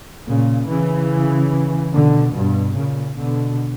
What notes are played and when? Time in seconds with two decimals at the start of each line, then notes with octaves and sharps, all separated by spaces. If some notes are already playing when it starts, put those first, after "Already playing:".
0.26 A#2 C#3
0.68 C#3 E3
1.93 B2 D3
2.34 G2 B2
2.75 A#2 C#3
3.17 B2 D3